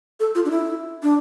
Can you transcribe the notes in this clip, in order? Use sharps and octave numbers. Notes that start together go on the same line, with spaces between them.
A4
F4
D4
E4
D4